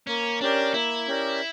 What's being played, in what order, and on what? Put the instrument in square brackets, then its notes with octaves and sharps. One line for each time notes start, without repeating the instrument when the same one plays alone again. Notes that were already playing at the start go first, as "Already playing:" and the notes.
[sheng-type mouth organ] A#3 [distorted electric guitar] C#4
[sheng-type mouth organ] C#4 G4 A#4 D5 [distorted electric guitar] D4
[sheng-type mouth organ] A#3 [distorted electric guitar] E4
[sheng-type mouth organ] C#4 G4 A#4 D5